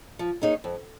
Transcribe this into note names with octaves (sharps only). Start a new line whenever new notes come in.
F3
A#3 D#4 G#4 C#5
F2